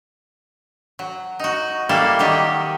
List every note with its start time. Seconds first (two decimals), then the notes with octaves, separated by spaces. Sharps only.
0.99 F#3
1.39 D#4 F#4
1.89 G3 A#3 E4 A4 F5
2.19 D#3 F#3 G4